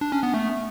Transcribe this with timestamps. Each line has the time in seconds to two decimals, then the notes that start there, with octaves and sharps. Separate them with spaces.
0.01 D4
0.12 C#4
0.23 B3
0.34 A3